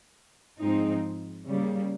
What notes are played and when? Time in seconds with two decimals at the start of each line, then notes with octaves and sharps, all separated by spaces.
0.59 G#2 F3 G#3 C4 D#4
1.48 C#3 G3 A#3